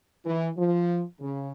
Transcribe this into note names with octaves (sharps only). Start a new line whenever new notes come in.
E3
F3
C#3